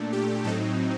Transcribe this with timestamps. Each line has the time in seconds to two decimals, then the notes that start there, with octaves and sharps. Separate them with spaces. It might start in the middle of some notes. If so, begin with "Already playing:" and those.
Already playing: A#2 A3 D4
0.13 G4
0.44 A2 F#3 C4 D#4 A4